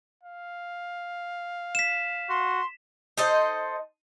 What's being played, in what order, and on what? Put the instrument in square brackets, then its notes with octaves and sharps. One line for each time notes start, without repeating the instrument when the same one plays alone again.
[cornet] F5
[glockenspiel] B6 E7
[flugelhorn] F#4 [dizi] C6
[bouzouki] D#4 A4 C5 D#5